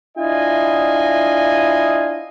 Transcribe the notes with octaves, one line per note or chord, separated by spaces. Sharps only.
D4 E4 F4 D#5 G#5